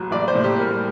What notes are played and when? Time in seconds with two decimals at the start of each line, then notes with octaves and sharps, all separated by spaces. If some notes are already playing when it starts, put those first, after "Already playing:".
Already playing: A1 F#3
0.11 A1 D5
0.28 C5
0.35 A2
0.44 G4
0.60 G3 A#4